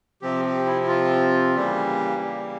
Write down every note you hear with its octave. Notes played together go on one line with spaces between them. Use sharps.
C3 F3 C4 G4
G4
E4
E4
F4
C#3 E3 G3 A#3 G4
G4